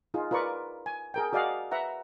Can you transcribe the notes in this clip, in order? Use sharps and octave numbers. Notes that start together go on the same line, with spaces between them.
D#4 F4 G#4
F4 A#4 B4 D5 C#6
G#5
G#4 A#4 G5
F#4 G#4 D5 D#5 F5 F#5
B4 E5 F#5 A#5